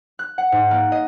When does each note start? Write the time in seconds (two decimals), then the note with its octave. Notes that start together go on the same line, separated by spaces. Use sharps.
0.19 F#6
0.38 F#5
0.52 G#2
0.71 A#3
0.92 D#5